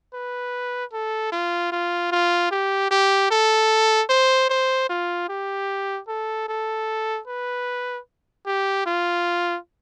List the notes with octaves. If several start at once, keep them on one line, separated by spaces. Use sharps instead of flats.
B4
A4
F4
F4
F4
G4
G4
A4
C5
C5
F4
G4
A4
A4
B4
G4
F4